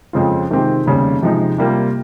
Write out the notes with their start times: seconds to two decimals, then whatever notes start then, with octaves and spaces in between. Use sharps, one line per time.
0.13 F2 C#3 G#3 C4 F4
0.50 C3 D#3 G#3 C4 G4
0.86 F1 D#2 C#3 G3 C#4
1.22 C3 F3 G#3 D#4
1.58 C3 G3 A#3 F4